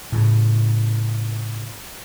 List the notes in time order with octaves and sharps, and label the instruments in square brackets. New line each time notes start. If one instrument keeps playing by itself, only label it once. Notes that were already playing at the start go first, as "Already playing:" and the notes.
[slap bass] A2 C#3